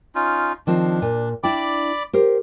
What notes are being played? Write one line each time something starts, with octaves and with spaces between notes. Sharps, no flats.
C#4 D#4 F4
D#3 F3 C4 D4
A#2
D4 E4 D5 G5 B5 D6
G4 A#4 C5